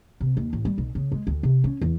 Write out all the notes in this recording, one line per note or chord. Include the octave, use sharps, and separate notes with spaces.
C3
D#2
A1
G3
B1
C#3
G#3
D2
C3
C#4
E2